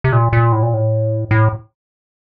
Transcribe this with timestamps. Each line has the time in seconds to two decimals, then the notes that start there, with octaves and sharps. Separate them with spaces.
0.04 C3
0.13 A#2
0.33 A#2
0.52 A2
0.63 A#2
0.74 A2
1.31 A2